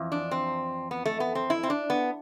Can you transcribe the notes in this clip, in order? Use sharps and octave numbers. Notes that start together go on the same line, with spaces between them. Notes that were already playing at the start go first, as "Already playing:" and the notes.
Already playing: F2 E3
D4
C4
B3
A3
B3
C4
E4
C4
D4
B3